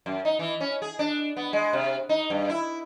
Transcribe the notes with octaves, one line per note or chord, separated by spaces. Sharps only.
F#2
D#4
E3
C#4
G#4
D4
B3
G#3
C3
D#4
G2
E4